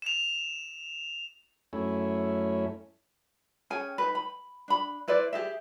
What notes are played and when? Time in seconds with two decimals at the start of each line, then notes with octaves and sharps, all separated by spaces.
0.02 E7 F7
1.73 F#2 A3 C#4 E4
3.70 C#4 G#4 G5 G#5
3.98 D#4 B4
4.15 B5
4.68 D4 B5
5.08 E4 B4 C5 D5
5.33 G4 G#4 E5